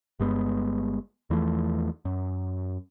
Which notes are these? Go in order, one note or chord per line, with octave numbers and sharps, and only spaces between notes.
G1 G2 G#3 B3
E2 E3 F3 A3
F#2